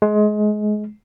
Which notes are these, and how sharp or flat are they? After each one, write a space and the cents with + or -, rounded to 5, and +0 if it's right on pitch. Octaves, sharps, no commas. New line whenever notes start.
G#3 +25